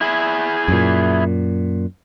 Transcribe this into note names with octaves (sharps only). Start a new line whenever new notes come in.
E4 G#4
F#2 A#2